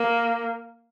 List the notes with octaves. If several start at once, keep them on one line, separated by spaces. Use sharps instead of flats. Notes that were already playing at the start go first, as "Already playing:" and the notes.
Already playing: A#3